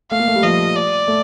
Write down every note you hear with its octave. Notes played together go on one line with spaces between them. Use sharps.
A3 F5
A#3
A3
G3
F3 D#5
D5
A3